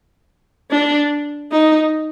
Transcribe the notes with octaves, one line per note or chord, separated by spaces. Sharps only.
D4
D#4